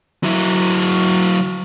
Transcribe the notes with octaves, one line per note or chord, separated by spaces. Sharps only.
F#3 E4